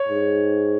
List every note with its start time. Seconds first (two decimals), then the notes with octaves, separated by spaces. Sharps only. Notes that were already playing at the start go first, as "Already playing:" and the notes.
Already playing: C#5
0.09 G#2